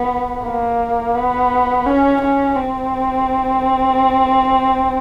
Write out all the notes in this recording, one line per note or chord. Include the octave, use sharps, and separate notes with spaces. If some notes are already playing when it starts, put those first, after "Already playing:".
Already playing: B3
A#3
B3
C#4
C#4
C4